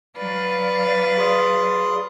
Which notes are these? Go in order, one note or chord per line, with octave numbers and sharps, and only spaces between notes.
F#3 B4 D5 F5
G#4 C6 D#6